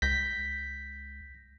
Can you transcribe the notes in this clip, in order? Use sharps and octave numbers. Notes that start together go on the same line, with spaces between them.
C#2 G6 A#6 B6